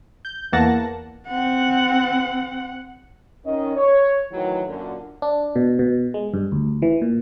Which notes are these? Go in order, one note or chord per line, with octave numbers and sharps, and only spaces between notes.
G6
E2 E3 A#3 F#5 A5 A#6
C4 F#5
D#3 C#4 D#5
C#5
A2 D#3 E3 F#3
F#2 A#2 D3
D4
B2
B2
G#3
G2
D2
E3
A#2